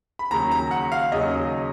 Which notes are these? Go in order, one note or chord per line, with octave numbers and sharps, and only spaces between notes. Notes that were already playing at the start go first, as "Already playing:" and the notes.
B5
D#2 C#3 F#3 A#5
A#5
F#5
F5
D#2 C#3 F#3 D#5